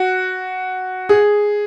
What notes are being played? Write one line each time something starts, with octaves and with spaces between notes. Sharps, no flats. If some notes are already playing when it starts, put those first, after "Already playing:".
Already playing: F#4
G#4